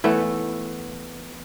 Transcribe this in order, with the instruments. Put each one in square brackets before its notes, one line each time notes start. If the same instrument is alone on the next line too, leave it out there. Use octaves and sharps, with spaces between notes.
[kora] E3 A3 B3 C#5